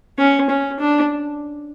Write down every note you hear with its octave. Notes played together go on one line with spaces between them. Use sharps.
C#4
C#4
D4